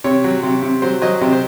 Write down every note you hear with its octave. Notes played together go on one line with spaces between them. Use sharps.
C3 C#5
F#3
C3
C3
F#3 C5
F#3 D#5
C3 D#5
C5